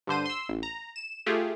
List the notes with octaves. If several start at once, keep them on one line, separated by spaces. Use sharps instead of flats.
G2 D3 C5 D#7
C6 E6
A1
A#5
E7
A3 F4 G4 G#4